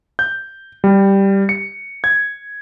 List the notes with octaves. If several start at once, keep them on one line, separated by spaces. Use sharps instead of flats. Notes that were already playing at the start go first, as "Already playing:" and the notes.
G6
G3
C#7
G#6